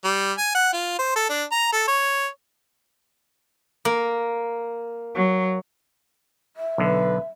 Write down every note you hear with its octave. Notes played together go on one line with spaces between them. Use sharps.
G3
G#5
F#5
F4
C5
A4
D4
A#5
A4
C#5
A#3
F#3
E5
B1 D3 B4